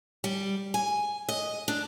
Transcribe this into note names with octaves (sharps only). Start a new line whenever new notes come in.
G3
G#5
D#5
D4